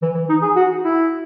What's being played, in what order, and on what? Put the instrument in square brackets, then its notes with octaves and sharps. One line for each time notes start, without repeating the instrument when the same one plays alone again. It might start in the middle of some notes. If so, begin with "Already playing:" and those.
[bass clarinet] E3
E3
D#4
G#4
F#4
E4